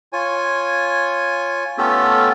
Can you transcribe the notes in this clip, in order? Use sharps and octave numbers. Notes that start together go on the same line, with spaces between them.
F4 C#5 G#5
A3 B3 C#4 F4 G4 A4